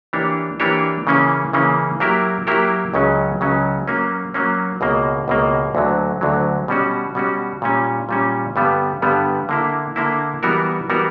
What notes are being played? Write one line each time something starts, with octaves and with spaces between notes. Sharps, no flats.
E3 A#3 D4 G4 C#5
E3 A#3 D4 G4 C#5
C#3 E3 A#3 C#4
C#3 E3 A#3 C#4
F#3 A#3 E4 G4 A#4
F#3 A#3 E4 G4 A#4
C#2 C#3 F#3 C#4
C#2 C#3 F#3 C#4
F#3 A#3 C#4
F#3 A#3 C#4
C#2 B2 A#3
C#2 B2 A#3
D2 D3 F#3
D2 D3 F#3
B2 G3 C#4 F#4
B2 G3 C#4 F#4
A#2 G3 C#4
A#2 G3 C#4
G2 D3 G3 B3
G2 D3 G3 B3
D3 A#3 E4
D3 A#3 E4
E3 G3 B3 F#4 A#4
E3 G3 B3 F#4 A#4